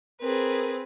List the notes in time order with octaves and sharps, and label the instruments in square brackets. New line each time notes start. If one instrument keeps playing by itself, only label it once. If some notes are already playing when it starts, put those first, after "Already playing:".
[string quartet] C4 G#4 B4 [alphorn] A#4